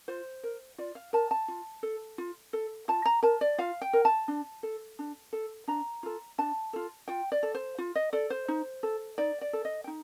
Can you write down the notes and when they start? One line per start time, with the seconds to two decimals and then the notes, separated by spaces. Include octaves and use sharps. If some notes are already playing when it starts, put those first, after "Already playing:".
0.08 F4 C5
0.43 A#4
0.78 F4 D5
0.95 F5
1.13 A#4 A5
1.31 A5
1.48 F4
1.83 A4
2.18 F4
2.53 A4
2.88 F4 A5
3.06 A#5
3.23 A#4 A5
3.41 D5
3.58 F4 F5
3.82 G5
3.93 A#4
4.05 A5
4.28 D4
4.63 A4
4.99 D4
5.33 A4
5.68 D4 A#5
6.03 F4 A4
6.38 D4 A5
6.73 F4 A4
7.08 F4 G5
7.32 D5
7.43 A4
7.55 C5
7.78 F4
7.96 D#5
8.13 A4 D5
8.30 C5
8.48 D#4
8.83 A4
9.18 D#4 D5
9.41 D5
9.53 A4
9.65 D#5
9.84 G5
9.88 D#4